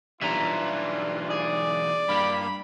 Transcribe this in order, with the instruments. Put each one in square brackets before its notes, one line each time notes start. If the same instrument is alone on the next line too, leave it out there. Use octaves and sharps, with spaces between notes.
[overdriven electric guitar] B1 E3 [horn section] G3 D4 F4 [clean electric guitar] E5 A#5
[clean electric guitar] G#4 [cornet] D5
[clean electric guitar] G2 A#3 G4 [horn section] B5